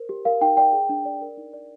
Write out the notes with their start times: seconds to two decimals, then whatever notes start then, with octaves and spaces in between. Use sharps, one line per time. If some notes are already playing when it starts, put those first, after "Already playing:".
Already playing: A#4 C5
0.09 G4
0.25 A#4 F5
0.41 D#4 G5
0.57 D5 G5
0.73 G#4
0.89 D4
1.05 D5
1.21 A#4
1.37 D#4
1.54 D5